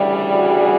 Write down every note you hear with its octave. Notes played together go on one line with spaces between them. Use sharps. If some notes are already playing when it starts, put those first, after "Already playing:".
Already playing: D2 C#3 E3 G3
F#4 G#4